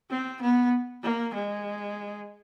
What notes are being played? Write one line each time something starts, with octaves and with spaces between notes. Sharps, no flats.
C4
B3
A#3
G#3